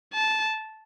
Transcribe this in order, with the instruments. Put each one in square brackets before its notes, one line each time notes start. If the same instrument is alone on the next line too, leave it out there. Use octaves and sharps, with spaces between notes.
[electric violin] A5